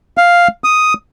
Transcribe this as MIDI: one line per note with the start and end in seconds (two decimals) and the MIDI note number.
0.18 0.48 77
0.64 0.94 87